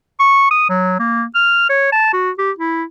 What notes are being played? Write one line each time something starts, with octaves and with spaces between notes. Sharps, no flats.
C#6
D#6
F#3
A#3
F6
C#5
A5
F#4
G4
E4